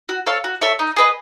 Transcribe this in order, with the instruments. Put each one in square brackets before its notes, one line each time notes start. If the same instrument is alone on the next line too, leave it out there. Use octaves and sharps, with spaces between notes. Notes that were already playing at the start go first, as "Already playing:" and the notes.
[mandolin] F#4
A4 C#5 F5
F#4
A4 C#5 E5
D#4
G#4 B4 D#5